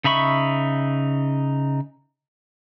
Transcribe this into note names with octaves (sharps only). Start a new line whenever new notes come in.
C#3 D#4 E5 B5 C#6